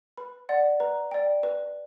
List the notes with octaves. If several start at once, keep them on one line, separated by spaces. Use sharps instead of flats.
B4 B5
D5 F#5
B4 A#5
D5 G5
B4